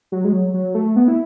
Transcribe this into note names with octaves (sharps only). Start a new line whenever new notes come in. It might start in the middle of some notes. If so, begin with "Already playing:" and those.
F#3
G#3
F#3
F#3
A3
B3
E4